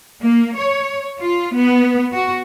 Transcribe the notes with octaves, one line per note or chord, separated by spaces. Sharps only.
A#3
C#5
F4
B3
F#4